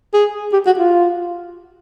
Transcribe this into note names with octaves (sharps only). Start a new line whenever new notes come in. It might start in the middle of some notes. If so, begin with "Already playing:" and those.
G#4
G4
F#4
F4